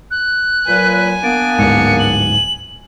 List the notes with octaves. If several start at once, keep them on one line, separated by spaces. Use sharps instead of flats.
F#6
A#2 F#3 B4 G#5
A#3 B3 D4 D7
D1 G#2 C#7
F#7